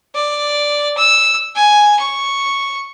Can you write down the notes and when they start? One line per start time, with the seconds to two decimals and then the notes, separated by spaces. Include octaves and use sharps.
0.15 D5
0.97 E6
1.55 G#5
1.99 C#6